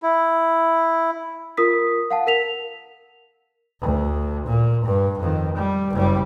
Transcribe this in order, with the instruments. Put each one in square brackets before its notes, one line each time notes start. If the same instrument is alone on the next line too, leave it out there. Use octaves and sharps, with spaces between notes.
[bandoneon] E4
[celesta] F4 A#4 D#6 B6
F5 F#5 A5
A#4 B6 F7
[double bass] D2
A#2
G2
F2 D#3
G3
F#1 G3